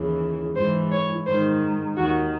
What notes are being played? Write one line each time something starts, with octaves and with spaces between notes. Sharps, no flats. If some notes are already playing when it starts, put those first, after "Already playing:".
Already playing: D#2 C#3 E3
G#2 C5
E3
C#5
G#2 C5
D#3
D#2 D#3 F#4